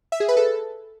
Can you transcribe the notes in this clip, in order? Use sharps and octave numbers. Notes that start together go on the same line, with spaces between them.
E5
G#4
B4
A4